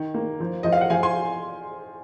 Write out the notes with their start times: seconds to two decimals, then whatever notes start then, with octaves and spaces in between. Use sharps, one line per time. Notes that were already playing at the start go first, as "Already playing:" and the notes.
Already playing: D#3
0.14 A#3
0.40 F3
0.63 F3 D#5
0.72 F5
0.81 F#5
0.90 F3 F5 G#5
1.03 G#5 C6